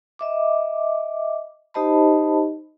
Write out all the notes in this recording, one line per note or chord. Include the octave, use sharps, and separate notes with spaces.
D#5 E5 D6
D#4 G4 C5 D#5 A5 B5